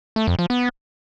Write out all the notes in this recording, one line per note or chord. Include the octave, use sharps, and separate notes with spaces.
A3
F2
F3
B3